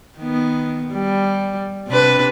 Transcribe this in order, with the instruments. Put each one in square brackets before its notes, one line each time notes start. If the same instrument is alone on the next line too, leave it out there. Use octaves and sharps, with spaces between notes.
[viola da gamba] D#3 B3
G3
C3 D4 B4